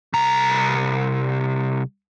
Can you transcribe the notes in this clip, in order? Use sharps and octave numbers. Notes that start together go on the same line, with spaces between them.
C2 A#5